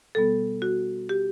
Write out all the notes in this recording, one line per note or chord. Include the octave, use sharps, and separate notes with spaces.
B2 G3 B3 A4
F#4
G4